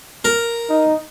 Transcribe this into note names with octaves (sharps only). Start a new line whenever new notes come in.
A#4
D#4